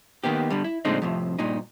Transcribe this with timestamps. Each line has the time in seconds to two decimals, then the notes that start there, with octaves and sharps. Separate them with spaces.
0.24 D#3 A#3 B3 G4
0.50 G2 D3 G3
0.64 E4
0.85 A#2 D3 G#3 A3 C4 D#4
1.02 F2 A2 C3
1.39 G2 A#2 D#4